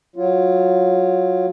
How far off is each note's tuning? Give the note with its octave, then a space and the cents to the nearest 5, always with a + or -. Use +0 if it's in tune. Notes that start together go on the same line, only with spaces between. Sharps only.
F#3 -10 F4 +0